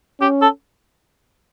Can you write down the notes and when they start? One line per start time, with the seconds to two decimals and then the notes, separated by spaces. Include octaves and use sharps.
0.20 C#4 G4
0.41 A4